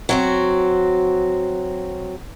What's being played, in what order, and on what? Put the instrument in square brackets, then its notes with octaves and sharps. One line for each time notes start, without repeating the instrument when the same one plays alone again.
[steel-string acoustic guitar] F#3 C4 F#4